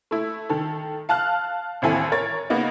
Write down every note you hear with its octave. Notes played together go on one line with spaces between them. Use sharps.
A3 E4
D#3 A4
F5 A5 F6 F#6
A1 D#2 C4 E4 A4 G#5
A#4 C#5 A6
C#3 A#3 B3 D#4